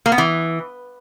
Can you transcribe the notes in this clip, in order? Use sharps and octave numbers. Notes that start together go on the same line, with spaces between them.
A#3
B3
E3